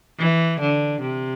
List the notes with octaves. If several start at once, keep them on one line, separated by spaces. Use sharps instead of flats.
E3
D3
C3